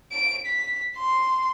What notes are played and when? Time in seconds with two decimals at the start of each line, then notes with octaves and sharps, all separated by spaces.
0.12 D7
0.46 B6
0.97 C6